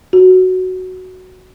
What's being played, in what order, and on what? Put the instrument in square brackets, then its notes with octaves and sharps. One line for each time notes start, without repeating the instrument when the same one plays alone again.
[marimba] F#4